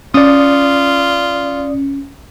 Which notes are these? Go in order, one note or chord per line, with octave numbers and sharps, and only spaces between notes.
C#4 F4 D5 D#6